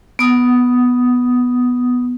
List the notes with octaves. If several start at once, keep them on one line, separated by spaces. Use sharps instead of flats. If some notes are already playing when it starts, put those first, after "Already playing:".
B3 D#6